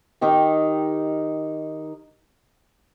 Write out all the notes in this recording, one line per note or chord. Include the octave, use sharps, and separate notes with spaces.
D#3 D#4 G4